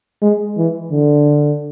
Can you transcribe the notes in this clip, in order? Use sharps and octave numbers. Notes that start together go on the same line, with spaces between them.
G#3
E3
D3